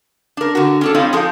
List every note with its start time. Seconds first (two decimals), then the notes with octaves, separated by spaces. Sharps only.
0.37 D4 A#4
0.55 D3 F#4
0.81 C#4 D4 A4
0.94 G3 C4 E4 F4 C#5 D#5
1.13 F3 D#4 G#4 A4